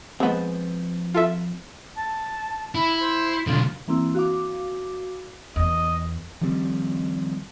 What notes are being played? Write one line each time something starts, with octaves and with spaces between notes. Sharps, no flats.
F3 G#3 B3 C4
F4 A4 E5
A5
E4 B5
C5
B1 D3 F4
E3 A#3 C4 E4
F#4 F5 D6
E2 D#5
D#3 F3 G3 C4